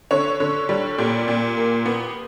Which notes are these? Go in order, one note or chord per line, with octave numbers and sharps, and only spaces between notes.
D3 C#5
D3
G3
A#2 G4
A#2
A#3
B3